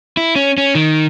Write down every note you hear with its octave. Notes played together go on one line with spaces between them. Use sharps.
E4
C#4
C#4
D#3